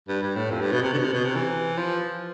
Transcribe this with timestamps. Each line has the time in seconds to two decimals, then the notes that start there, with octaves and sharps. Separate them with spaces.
0.08 G2
0.22 G2
0.36 A2
0.51 F2
0.61 G2
0.72 B2
0.83 C3
0.93 D3
0.98 B2
1.04 C3
1.13 B2
1.24 C3
1.35 E3
1.78 F3